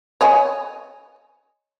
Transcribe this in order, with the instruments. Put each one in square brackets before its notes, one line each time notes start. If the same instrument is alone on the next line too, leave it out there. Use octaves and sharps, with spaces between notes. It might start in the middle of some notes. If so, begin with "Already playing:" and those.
[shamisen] C#5 D#5 G#5